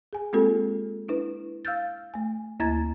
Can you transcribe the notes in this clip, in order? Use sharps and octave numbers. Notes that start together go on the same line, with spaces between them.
G#4 G#5
G#3 A#3 C4 F4 G4 A4
D4 E4 B4
F5 E6 F6 G6 A6
A3 G#5
D2 A#3 E4 A#5 G#6 A6